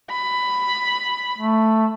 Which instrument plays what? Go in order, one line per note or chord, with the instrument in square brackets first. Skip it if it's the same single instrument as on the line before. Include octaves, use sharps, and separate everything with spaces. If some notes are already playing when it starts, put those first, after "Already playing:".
[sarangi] B5
[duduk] A3